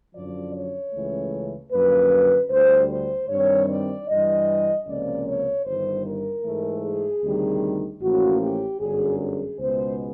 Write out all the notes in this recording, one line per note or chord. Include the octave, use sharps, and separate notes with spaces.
F#2 D3 F3 D5
C#5
C#2 C#3 E3 A3
F#2 D3 F3 A#3 B4
D2 D3 G3 C5
C5
G2 D#3 G3 C4 C#5
D5
G2 E3 G3 D#5
C#2 C3 F3 A#3 C#4 D5
C#5
G1 G2 D#3 C5
A#4
G#2 E3 A3
G#4
D2 C3 D#3 G3
A1 A2 F3 A#3 C#4 F#4
G4
G1 F#2 D3 F#3 G#4
G#4
C#2 B2 G#3 B3 C5